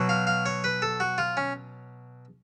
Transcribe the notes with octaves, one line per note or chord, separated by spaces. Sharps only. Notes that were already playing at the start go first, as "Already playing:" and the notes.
Already playing: B2 F#3
F5
F5
C#5
B4
A4
F#4
F4
C#4